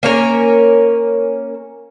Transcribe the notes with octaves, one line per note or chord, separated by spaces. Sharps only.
A#3 C#4 A#4